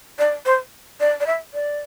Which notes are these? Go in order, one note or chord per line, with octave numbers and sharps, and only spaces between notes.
D5
C5
D5
D5
E5
D5